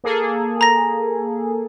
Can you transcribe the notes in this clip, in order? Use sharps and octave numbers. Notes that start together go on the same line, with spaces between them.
A#3 G#4 A4
A#5 A#6